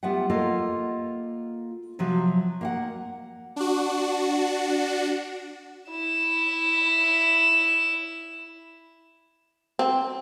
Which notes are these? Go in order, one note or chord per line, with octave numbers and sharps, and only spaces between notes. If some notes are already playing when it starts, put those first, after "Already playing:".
G3 B3 F4 E5 F#5
A#3 F4 A4 D#5
C3 F3 F#3
A#3 F5 F#5
D4 F#4
E4 E7
C4